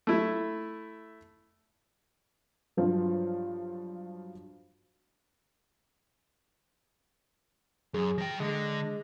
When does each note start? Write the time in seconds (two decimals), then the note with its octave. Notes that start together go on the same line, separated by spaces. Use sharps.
0.07 A3 E4
2.77 G2 F3 F#3
7.94 F#2 G#4
8.18 F3 G5 A#6
8.40 D3 G#3